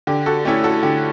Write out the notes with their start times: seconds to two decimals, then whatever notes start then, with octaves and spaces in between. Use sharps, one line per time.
0.07 D3 G4
0.26 F#4 A4
0.45 A3 C#4 E4 G4
0.64 F#4 A4
0.83 D3 G4